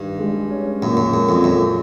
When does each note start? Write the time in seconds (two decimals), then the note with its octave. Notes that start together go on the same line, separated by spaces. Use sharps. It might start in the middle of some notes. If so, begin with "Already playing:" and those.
Already playing: G2 D#3
0.19 G#3
0.50 C#4
0.82 F#2 A#2
0.97 F#2
1.13 F#2 G#3
1.29 F2
1.44 F#2 F3